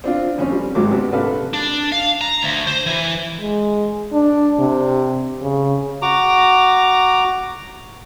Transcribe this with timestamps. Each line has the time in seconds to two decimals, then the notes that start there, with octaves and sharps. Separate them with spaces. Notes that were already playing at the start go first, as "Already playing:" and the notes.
0.04 C4 D4 F4
0.38 F2 C4 C#4 C5
0.52 G3
0.75 G#1 G#2 F#3 C4 D6
0.91 C3 B3 C#4
1.12 A#1 C3 A4 B4 F5
1.53 D4
1.92 F5
2.21 A#5
2.43 D2
2.67 C5
2.86 E3
3.39 G#3
4.13 D4
4.59 C3
5.41 C#3
6.02 F#4 A#5 D6